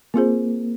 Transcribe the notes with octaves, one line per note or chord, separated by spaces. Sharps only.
A#3 C4 F4 G#4 C5